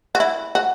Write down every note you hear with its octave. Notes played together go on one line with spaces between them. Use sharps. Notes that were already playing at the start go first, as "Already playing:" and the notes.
F#4
E4
F#4